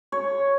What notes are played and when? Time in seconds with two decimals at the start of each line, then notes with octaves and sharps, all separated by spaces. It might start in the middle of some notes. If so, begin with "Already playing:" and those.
0.12 C#5